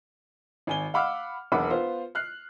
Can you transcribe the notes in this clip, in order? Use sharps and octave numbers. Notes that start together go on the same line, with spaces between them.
G#1 G#5 G7
F5 F#5 B5 D6 E6 F6
E1 B1 A#3 F#5 B5 D6
B3 F4 C5
F6 F#6 C7